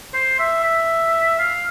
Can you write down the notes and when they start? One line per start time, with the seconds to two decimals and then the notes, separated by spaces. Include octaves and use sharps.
0.14 C5
0.39 E5
0.64 E5
1.39 F5